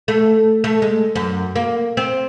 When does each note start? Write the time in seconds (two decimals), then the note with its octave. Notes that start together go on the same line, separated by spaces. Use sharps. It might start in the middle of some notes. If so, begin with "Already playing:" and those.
0.08 A3
0.64 A3
0.82 G#3
1.15 F#2
1.56 A#3
1.97 C4